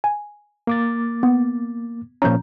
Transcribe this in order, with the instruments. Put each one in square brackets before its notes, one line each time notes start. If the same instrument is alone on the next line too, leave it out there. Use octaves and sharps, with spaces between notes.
[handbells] G#5
[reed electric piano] A#3 D6 A6
[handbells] B3
[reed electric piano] A#2 F3 C#4 [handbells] A#5 G6